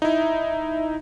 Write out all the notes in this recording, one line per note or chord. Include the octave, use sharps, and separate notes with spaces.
D#4 E4 E5